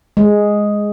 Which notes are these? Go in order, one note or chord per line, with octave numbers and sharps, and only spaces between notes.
G#3